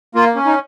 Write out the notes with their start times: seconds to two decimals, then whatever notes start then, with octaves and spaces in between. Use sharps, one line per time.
0.15 A#3 F4
0.35 C#4
0.45 D#4